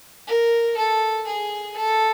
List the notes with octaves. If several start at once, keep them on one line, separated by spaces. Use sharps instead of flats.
A#4
A4
G#4
A4